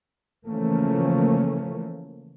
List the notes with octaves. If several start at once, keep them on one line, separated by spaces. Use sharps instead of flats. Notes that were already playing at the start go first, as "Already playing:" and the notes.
C#3 E3 F3 A3 A#3 C#4